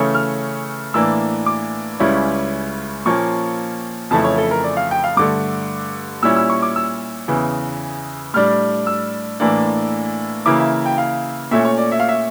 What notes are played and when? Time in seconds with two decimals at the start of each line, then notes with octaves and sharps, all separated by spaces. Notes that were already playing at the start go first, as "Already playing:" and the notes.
Already playing: C#3 E3 A3 C#4
0.15 F6
0.94 A2 E3 A#3 D4 E6
1.46 D6
2.00 C#2 C#3 G3 C#4 E4
3.05 A#2 F3 A#3 C#4 C#6
4.11 F2 C#3 E3 A3 E4 A5
4.24 C#5
4.38 A4
4.51 A#4
4.64 D5
4.77 F5
4.91 G5
5.04 F5
5.17 G2 D3 A3 D6
6.22 A#2 G3 C#4 E4 E6
6.36 E6
6.50 C#6
6.63 D6
6.76 E6
7.28 E2 C#3 E3
8.34 A2 G3 D4 F6
8.87 E6
9.40 A2 E3 A#3 D4
10.46 C#3 E3 A#3 E4 D6
10.59 E5
10.86 G5
10.98 F5
11.51 A#2 A3 C#4 E5
11.65 C#5
11.78 D5
11.92 E5
12.00 F5
12.08 E5